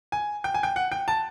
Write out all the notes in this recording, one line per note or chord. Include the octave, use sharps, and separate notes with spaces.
G#5
G5
G#5
G5
F#5
G5
A5